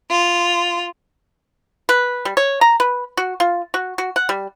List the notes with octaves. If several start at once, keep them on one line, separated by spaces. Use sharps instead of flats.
F4
B4
G3
C#5
A#5
B4
F#4
F4
F#4
F#4
F#5
G3